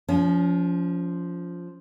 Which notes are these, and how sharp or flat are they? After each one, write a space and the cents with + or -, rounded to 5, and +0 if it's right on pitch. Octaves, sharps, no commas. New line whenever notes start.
F3 +0 C#4 +35